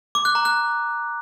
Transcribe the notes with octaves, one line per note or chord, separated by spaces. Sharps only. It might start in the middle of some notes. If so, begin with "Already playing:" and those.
D6
F#6
A#5
F#6